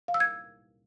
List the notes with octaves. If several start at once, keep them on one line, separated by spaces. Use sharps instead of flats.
F5
E6
G#6